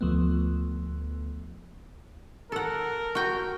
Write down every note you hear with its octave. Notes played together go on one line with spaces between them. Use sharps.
D2 F3 A3 B3
A4 A#4 F#5
F#4 G5